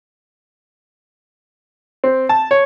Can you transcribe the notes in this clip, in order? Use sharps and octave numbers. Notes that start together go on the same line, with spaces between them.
C4
A5
C#5